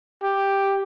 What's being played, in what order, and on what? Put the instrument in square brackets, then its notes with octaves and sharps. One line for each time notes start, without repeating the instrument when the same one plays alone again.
[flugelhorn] G4